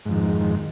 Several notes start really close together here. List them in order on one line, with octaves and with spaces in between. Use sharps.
G#2 F2 D#3